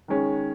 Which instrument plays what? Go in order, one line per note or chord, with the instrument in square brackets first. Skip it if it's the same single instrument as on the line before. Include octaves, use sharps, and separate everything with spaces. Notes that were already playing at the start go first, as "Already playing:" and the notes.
[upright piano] D#3 G#3 C#4